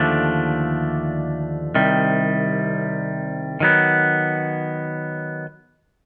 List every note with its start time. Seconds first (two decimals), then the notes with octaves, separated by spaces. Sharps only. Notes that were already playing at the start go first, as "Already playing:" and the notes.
Already playing: D#2 D3 F3 A3 D4
1.75 C2 C3 D#3 G3
3.60 D#3 F#3 B3